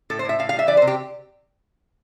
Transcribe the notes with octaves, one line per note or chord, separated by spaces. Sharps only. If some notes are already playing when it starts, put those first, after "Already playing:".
A2 A4
C5
A2 E5
A2 F5
F5
G3
E5
E3 D5
C5
C3
G4